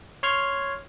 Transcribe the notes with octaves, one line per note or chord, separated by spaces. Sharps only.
C#5 C6 F6 G#6